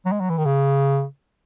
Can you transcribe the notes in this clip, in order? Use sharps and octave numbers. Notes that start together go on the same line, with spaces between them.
F#3
G#3
F#3
E3
D#3
C#3